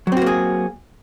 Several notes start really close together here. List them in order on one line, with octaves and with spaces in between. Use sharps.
F#3 C4 F#4 A#3 G#4